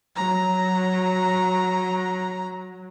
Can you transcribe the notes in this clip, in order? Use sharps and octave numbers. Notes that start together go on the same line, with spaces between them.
F#3 A#5